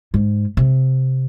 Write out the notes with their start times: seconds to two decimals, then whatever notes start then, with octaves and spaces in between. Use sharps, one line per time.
0.14 G#2
0.57 C3